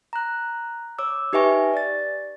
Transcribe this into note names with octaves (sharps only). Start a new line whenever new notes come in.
A#5 F#6
C#5 D6 E6
D#4 G4 B4 E5 G#5 C#6
D5 A6